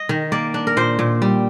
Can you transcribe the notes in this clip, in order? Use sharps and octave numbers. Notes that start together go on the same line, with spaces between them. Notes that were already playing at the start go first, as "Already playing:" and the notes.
Already playing: D#5
D#3
A#3 D5
D4
A#4
A#2 C5
A#2
G3